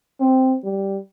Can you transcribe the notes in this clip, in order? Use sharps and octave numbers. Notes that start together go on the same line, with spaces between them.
C4
G3